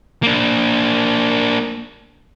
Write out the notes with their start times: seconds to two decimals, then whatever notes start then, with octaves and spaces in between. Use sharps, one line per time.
0.23 A#3 D4